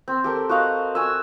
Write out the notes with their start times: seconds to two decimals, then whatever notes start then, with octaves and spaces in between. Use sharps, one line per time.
0.08 C4
0.24 G4 A4 A#4
0.49 F#4 D#5 F5 F#5
0.95 F#4 G#5 E6